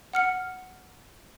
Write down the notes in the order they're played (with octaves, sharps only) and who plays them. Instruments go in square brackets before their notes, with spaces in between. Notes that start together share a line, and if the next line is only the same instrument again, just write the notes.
[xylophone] F#5 F6 C#7